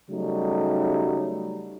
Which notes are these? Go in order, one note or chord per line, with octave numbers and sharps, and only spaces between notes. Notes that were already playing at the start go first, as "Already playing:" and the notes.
C#3 F#3 G3 A3 D#4